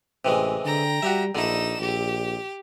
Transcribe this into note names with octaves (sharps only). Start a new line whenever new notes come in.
A1 C3 E3 G#3
D3 G5 A#5
G3 F#4 G4 E5
A#1 D3 D#4 E4 E7
A#1 G4